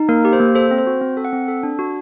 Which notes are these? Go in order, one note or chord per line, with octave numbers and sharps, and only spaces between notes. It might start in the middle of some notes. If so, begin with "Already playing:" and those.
Already playing: D#4
A#3 A#4
G4
C5
A#3
A4 C5
C4
C5
F#4
C4
A4
F#5
C4
A4
D4
F#4